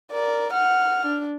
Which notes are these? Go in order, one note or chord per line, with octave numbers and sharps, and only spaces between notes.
A#4 D5
F#5 F6
D4